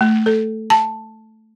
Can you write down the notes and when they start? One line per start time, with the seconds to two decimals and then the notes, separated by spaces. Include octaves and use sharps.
0.01 A3
0.26 A4
0.70 A5